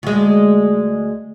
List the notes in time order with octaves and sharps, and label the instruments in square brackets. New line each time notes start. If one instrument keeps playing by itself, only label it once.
[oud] D2 G#3